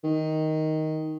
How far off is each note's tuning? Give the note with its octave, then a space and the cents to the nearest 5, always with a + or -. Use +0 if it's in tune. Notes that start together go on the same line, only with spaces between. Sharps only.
D#3 +5